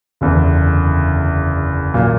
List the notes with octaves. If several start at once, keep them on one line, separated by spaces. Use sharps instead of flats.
F#1 E2 D3
B1 A#2 F#3 A#3